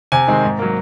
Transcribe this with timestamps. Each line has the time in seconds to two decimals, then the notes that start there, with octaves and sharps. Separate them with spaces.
0.12 C3 G#5
0.28 D#3 G#3 C4
0.44 G#2
0.59 F#3 A#3